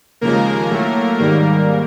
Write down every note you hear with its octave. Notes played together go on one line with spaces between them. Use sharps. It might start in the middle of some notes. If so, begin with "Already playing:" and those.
D#2 C#3 F3 G#3 A#3 A#4
A2 F#3 A3
G#2 D#3 G3 A#3 A#4